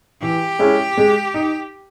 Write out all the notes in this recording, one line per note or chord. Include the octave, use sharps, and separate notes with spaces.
E3 G4
G#3 C#4 E4
G#3
D#4